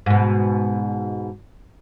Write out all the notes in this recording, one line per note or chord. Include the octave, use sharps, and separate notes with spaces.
G#2 B2